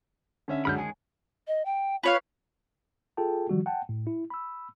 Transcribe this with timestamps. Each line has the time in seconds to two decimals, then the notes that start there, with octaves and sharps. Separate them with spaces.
0.48 D3 C#4 E5
0.65 F#2 D3 G#3 B5 F6 G6
0.78 D#3 G#3 G#4 G#5
1.48 D#5
1.65 G5
2.03 F4 B4 C#5 F5
3.17 F4 G#4 A4 G5 A5
3.49 D#3 F3 G3 F#4
3.66 F#5 G5 A5
3.89 A2
4.07 E4
4.30 B5 E6